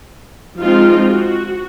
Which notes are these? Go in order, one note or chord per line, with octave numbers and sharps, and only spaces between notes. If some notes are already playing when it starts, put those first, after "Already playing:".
F3 G#3 C4 D#4 F4
F#4